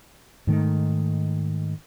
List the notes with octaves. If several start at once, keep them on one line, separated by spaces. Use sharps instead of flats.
G#2 D#3 A3